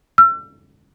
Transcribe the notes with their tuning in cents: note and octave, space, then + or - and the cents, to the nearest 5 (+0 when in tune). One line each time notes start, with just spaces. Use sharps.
E6 +40